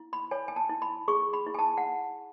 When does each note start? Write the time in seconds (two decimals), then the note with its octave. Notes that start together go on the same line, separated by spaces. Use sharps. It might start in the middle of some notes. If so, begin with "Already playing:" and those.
Already playing: E4
0.13 B5
0.31 C#5 G#5
0.48 G#5
0.56 A5
0.69 E4
0.82 B5
1.08 G#4 C#6
1.33 B5
1.47 E4
1.54 G#5
1.59 A5
1.77 F#5